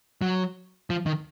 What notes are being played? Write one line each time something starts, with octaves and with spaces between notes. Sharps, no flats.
F#3
F3
D#3